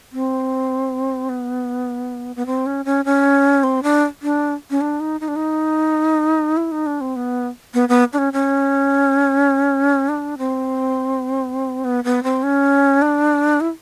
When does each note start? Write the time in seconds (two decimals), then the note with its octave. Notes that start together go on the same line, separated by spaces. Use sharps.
0.12 C4
1.29 B3
2.36 B3
2.46 C4
2.66 C#4
2.85 C#4
3.05 C#4
3.63 C4
3.83 D4
4.22 D4
4.70 C#4
4.81 D4
5.00 D#4
5.21 D#4
5.28 D4
5.36 D#4
6.57 E4
6.72 D#4
6.86 D4
7.01 C4
7.16 B3
7.74 B3
7.89 B3
8.13 D4
8.18 C#4
8.33 C#4
10.09 D4
10.38 C4
11.84 B3
12.04 B3
12.24 C4
12.43 C#4
13.02 D4
13.61 E4